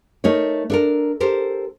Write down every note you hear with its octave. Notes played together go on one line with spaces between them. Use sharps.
A3 D#4 A#4 C#5
D4 A4 A#4
G4 A4 A#4 C5